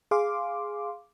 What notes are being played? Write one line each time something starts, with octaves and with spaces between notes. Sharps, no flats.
G#4 F5 C6 D6